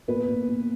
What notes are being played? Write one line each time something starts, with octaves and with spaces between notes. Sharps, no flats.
A#2 B3 B4
A#2
A#2